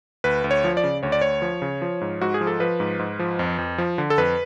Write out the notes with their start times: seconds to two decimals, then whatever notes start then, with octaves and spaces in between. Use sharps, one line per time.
0.24 D2 B4
0.44 D2
0.51 C#5
0.64 F3
0.77 D5
0.84 C#3
1.03 D2 C#5
1.12 D5
1.21 D2 C#5
1.42 F3
1.62 C#3
1.82 F3
2.01 G#2
2.21 G#2 F#4
2.34 G#4
2.41 F3
2.47 A4
2.60 F3 B4
2.80 G#2
2.99 G#2
3.19 F3
3.39 F2
3.58 F2
3.78 F3
3.98 D3
4.10 A4
4.18 F2 B4